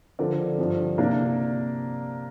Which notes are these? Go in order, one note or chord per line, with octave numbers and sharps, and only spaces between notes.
D3 F3 C4 A#4 D5
G2 F3 C4
C3 A#3 D4